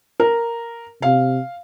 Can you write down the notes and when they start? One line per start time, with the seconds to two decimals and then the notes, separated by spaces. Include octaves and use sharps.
0.20 A#4
1.02 C3 F5